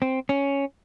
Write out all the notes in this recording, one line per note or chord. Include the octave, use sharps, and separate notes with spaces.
C4
C#4